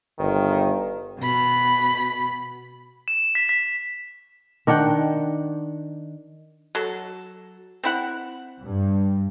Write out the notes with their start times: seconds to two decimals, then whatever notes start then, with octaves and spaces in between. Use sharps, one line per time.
0.19 G1 D#3
1.20 B2 B5
3.08 E7
3.35 B6
3.49 B6
4.67 D#3 D4 F#5 G5
6.75 F#3 A4
7.84 C4 E4 F#5
8.62 G2